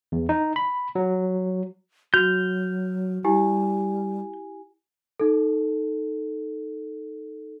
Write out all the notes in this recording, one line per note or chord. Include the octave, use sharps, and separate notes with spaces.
E2
D#4
B5
F#3
F#3 F#4 F6 G6 F7
G3 E4 G4 G#5
D#4 A4